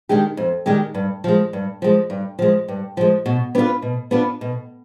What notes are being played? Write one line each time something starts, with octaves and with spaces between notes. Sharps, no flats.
D#3 G#3 D4 G4
F2
D#3 G#3 D4 G4
G2
F3 G#3
G2
F3 G#3
G2
F3 G#3
G2
F3 G#3
B2
B3 D4 F4 B4
B2
B3 D4 F4 B4
B2